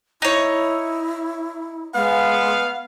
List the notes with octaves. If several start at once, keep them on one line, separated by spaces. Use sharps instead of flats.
D#4 E4 C#5
G#3 B3 F5